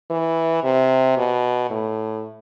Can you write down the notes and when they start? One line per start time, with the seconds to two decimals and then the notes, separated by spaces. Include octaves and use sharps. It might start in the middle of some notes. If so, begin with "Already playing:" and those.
0.11 E3
0.64 C3
1.18 B2
1.70 A2